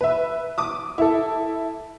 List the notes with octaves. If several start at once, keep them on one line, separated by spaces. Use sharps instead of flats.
B4 E5
D6 D#6
E4 A4